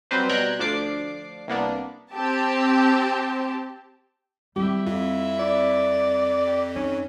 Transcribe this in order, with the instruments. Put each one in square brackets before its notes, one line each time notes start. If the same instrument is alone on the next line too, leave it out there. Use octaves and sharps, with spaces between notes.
[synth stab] F#3 G3 C4 B4 C5
B2 G3 G5 A#5 F#6 G#6
D2 F3 D4 D6 C7
C2 A#3 B3 D4
[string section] C4 G4 A5
[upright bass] G3 C4 [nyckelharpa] E4 E5 [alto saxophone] G4
[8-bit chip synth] F2 [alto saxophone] F4
[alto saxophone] D5
[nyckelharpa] G4
[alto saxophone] C#4 [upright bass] D#4